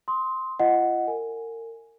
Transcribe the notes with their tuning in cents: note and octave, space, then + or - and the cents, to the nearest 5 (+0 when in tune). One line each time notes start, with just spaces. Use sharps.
C6 +0 D#6 +30
F4 -40 D#5 +0 F#5 +0
A#4 -35 G#5 +0